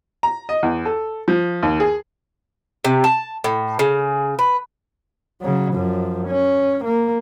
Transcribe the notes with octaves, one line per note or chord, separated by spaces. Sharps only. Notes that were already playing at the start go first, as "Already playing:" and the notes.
A#5
D#5
E2
A4
F3
D#2
G#4
C3
A5
A2
C#3
B4
C#3 F#3
F#2 F3
C#4
A#3